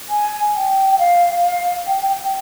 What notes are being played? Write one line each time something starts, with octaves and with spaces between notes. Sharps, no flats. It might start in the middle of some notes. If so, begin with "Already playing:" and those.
G#5
G5
G5
F5
F5
G5
G5